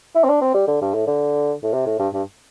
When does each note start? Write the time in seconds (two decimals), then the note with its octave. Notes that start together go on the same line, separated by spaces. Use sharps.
0.15 E4
0.24 C4
0.29 D4
0.42 C4
0.55 G3
0.68 D3
0.82 G2
0.94 A2
1.07 D3
1.63 A2
1.73 C3
1.86 A2
1.99 G2
2.14 G2